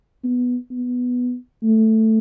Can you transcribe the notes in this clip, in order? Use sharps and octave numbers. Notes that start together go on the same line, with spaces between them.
B3
B3
A3